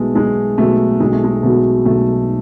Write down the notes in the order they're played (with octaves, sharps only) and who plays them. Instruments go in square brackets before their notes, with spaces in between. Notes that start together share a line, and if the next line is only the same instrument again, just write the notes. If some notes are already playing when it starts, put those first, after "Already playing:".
Already playing: [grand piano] B1 B2 F#3 B3 F#4 [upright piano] G#3 A3
[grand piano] B1 [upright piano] G#3
[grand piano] B2 F#3 B3 F#4 [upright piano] A3
[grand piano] B1 [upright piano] G#3
[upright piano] A3
G#3
[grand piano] B2 F#3 B3 F#4 [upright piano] A3
[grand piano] B1 [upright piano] A3